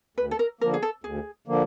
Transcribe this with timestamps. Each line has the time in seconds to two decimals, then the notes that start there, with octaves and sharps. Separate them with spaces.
0.17 D2 B4
0.31 A4
0.39 A#4
0.61 D3 F3 A#3 A#4
0.74 G#4
0.82 A4
1.04 D2 G#4
1.47 D3 F3 A#3